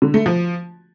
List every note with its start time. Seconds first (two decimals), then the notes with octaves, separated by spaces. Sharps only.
0.02 D3
0.14 A3
0.26 F3